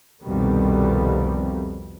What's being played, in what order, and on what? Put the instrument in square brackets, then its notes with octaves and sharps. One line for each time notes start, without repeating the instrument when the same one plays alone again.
[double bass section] C2 F2 B2 D#3 G3